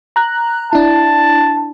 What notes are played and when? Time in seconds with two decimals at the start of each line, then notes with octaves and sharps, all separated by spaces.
0.16 A#5 F#6
0.73 D4 E4 A5